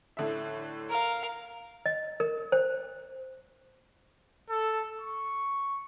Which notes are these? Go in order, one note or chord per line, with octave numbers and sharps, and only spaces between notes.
A2 D3 E5
A#4 F5
D#5
A#4
C5
A4
C#6